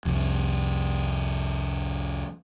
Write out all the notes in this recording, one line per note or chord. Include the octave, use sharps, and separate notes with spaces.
C2 F2